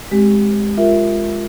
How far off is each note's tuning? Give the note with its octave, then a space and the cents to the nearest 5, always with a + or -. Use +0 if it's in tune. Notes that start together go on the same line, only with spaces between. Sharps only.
G#3 +0 C4 +0 G4 +0
F4 +0 A#4 +0 E5 +0